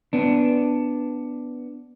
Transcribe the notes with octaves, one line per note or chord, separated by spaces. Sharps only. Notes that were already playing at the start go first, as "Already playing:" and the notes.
B3 D4